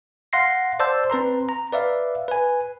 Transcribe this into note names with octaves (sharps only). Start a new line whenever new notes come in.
F5 F#5 C6 A#6 C7
C5 D5 A5 C6 E6 G6
C4 B4 A#5 C6
A#5
B4 D5 E5 F5
B4 G#5